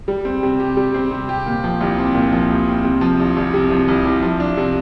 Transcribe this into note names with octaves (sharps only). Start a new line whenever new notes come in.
G3
C4
C3
G4
G3
C4
C3
G4
A#2
F3
C2
C4
A#2
F3
C2
C4
C3
F3
C2
C2
C3
F3
C2
C2
F3
D4
C3